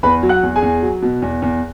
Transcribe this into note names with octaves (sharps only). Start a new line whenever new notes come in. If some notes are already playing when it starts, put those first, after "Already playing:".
E2 B4 B5
F#3
F#5 F#6
E2
G#4 G#5
E2
F#3
B2
E2
E2